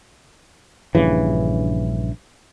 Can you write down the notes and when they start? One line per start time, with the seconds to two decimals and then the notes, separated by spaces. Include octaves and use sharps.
0.95 A#1 G2 C#3 E3